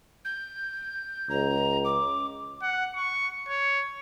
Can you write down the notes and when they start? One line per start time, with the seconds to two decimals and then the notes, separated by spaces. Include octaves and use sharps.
0.25 G6
1.30 C#2 A#5
1.84 D6
2.62 F#5
2.96 C#6
3.49 C#5